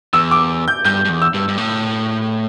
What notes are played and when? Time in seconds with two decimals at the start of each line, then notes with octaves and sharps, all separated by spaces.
0.13 E2 E6
0.31 D6
0.68 G6
0.85 G2 G6
1.05 G2
1.09 E2
1.22 E6
1.34 G2
1.48 G2
1.58 A2